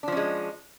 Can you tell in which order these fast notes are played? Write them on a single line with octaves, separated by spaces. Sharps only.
D4 F3 C#4 G#3